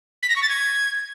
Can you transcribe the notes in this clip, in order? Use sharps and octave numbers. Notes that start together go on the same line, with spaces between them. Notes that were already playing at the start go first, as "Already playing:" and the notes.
B6
A#6
C#6
A6
G#6